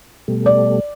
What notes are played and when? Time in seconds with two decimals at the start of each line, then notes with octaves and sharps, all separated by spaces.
0.28 B2 G3 A3
0.46 D5